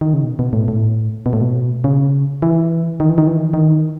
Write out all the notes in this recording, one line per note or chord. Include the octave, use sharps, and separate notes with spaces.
D#3
C#3
B2
B2
A2
A2
B2
A2
B2
C#3
E3
D#3
E3
D#3
E3
D#3
E3
D#3